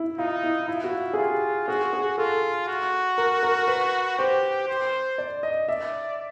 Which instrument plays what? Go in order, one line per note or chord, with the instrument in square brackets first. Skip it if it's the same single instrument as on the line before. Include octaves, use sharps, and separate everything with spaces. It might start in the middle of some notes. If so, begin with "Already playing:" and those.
Already playing: [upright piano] E4
[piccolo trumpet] D#4 [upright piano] F4
[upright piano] E4
[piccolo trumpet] E4 [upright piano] F4
[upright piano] F#4
F4
G#4
[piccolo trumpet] F4 [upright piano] G4
[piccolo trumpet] F#4 [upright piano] G#4
[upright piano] G#4
[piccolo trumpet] F4 [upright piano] A4
[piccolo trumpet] F#4
[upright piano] A#4
A#4
B4
[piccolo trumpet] G4 [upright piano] C5
[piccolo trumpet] C5
[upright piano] D5
D#5
[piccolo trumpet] D5 [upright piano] E5